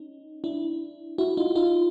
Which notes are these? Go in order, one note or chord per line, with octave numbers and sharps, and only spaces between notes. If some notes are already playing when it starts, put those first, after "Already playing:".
Already playing: C#4 D#4
D4 E4
E4 F#4
D#4 F4
D#4 F4